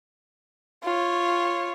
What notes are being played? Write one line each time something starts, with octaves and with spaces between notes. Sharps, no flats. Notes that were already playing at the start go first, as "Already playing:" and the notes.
F4 C#5